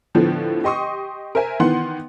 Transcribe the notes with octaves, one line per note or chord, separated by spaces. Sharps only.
A2 D3 F3 B3
G4 D#5 C6 C#6 D#6
A#4 C5 E5 G#5
D#3 E3 B3 F#5 C6